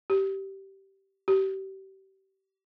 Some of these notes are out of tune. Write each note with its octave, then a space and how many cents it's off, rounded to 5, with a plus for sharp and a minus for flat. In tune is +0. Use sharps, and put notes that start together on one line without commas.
G4 -15
G4 -30